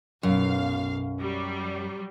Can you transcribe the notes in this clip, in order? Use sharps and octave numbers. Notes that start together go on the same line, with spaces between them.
B1 F#2 F5
F#3 G3